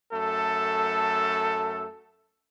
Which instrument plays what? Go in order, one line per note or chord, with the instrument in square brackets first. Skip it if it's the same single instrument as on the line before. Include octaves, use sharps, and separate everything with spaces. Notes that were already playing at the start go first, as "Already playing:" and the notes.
[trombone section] F#2 A3 A4